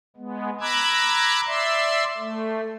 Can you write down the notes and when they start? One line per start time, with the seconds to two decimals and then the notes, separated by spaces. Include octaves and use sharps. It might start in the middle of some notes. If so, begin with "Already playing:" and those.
0.17 G#3 B3
0.61 A#5 B5 D6 E6 F#6 G#6
1.47 D5 E5 C6 E6
2.17 A3